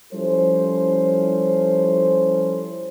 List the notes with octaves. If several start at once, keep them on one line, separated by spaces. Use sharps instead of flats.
F3 G3 C#4 E4 A4 C5